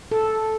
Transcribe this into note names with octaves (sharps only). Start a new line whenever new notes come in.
A4